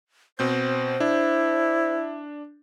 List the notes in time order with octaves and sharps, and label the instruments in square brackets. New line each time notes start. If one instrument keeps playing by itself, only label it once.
[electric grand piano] B2 C4 G6 [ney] C5
[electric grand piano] D4 [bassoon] E4